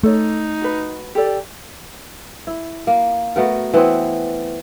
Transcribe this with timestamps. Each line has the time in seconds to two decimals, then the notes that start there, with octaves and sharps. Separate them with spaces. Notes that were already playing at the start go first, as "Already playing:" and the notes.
0.03 A3 D#4 A4 C#5
0.61 F#4 B4
1.15 G4 A4 D5
2.47 E4
2.87 A#3
3.36 A3 B3 F#4 A#4
3.74 E3 B3 C4